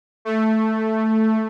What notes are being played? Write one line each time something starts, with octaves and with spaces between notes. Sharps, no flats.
A3